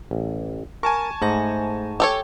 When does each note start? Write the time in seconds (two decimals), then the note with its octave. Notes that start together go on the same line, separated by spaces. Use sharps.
0.11 A1
0.83 A#4 G#5 A5 C#6
1.22 G#2 A3 C5 A#6
2.00 G4 A4 C#5